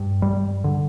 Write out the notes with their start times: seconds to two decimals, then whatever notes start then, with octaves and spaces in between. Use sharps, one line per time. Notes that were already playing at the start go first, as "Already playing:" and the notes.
Already playing: G2
0.22 G3
0.64 D3